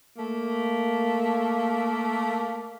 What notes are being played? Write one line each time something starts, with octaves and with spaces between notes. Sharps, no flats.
A3 A#3